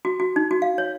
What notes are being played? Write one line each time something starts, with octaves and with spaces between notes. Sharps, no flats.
F#4
F#4
D#4
F#4
F5
C#5